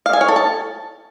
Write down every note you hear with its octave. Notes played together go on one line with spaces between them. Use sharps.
F5
G#5
C#5
A4
A5